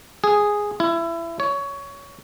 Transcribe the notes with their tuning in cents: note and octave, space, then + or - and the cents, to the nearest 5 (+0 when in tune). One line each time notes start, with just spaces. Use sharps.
G#4 -5
E4 +25
C#5 +15